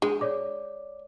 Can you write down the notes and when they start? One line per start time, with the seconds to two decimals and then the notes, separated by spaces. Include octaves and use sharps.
0.02 G#3 D4
0.21 C#5 D5 D6